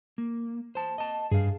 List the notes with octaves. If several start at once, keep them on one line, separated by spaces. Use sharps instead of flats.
A#3
C5 A5
D#5 A5
G2 G#4 F5